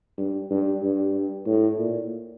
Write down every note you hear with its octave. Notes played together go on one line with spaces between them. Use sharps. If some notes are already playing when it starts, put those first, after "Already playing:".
G2
G2
G2
A2
A#2